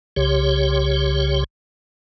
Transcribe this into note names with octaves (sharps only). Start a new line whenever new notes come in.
C2 C#3 G4 C#5